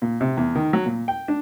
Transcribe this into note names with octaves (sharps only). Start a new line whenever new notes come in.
A#2
C3
E2
D#3
F#3
A#2
G5
D4